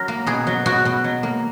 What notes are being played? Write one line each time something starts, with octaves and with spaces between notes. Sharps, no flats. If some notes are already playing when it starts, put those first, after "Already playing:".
Already playing: F#3 A#4
A#3
B2 G#4
F#3
B2 F#4
B2
F#3
A#3